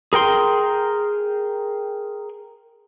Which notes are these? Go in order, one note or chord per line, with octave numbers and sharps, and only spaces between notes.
G#4 A#4 G5 C6